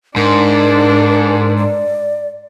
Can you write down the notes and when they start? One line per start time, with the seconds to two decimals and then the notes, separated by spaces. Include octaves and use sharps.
0.16 G#2 D4 A#4
1.57 D5